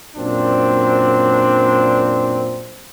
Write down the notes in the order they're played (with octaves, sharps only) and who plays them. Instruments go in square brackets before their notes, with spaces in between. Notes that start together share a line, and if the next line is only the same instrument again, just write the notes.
[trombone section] F#2 A#2 C4 D4